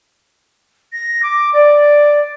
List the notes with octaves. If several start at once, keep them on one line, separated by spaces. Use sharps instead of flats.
A#6
D6
D5